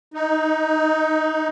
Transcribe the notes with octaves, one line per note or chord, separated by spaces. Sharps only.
D#4